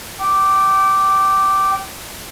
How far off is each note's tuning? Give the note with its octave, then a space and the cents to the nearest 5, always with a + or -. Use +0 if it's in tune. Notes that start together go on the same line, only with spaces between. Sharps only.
G5 -30 D6 +0